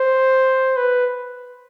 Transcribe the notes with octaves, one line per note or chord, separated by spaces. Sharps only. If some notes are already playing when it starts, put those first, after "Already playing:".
Already playing: C5
B4